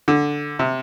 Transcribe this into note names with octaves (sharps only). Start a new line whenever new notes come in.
D3
C3